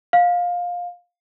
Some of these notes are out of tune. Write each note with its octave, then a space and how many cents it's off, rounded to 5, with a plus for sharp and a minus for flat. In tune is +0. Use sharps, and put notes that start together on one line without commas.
F5 +20